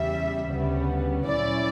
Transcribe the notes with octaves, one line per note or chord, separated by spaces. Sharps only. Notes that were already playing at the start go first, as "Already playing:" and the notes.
Already playing: E2 C#3 G3 E5
D2 C#3 G3 B3
A#2 F#3 C#4 E4 D5